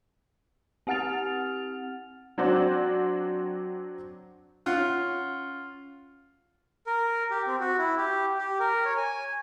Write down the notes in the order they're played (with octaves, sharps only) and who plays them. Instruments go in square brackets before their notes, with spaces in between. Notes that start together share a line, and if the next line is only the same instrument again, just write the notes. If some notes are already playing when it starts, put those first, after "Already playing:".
[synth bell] C4 G4 F#5 F6 A6 F7
[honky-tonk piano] F#3 C4 D4 F#4 C5 D5
[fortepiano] C#4 F4 F#5
[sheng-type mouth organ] A#4
G4
C4
F#4
E4
G4
G4
A#4
C#5
G#5